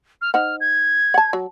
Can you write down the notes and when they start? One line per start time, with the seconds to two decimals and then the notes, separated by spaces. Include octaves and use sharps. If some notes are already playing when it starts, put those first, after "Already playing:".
0.22 F6
0.34 D#4 C5 F#5 F6
0.61 G#6
1.14 F#5 A5
1.33 F#3